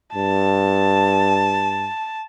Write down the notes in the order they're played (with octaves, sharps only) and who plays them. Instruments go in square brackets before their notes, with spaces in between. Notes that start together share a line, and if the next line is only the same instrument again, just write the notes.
[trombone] G2 [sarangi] A5